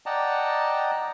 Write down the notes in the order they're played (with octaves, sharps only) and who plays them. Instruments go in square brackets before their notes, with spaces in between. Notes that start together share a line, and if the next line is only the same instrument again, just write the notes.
[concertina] D5 D#5 F#5 G5 A5 A#5